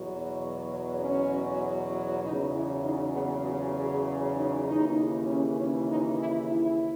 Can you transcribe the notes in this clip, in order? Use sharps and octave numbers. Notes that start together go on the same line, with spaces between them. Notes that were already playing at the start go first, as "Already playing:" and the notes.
Already playing: E2 B2 F#3
C#4
E2 C#3 F#3 D#4
E4
D#4
B3
F#4
G#4
D#4
D#2 C#3 E3 D#4
C#4
C#4
D#4
E4
E4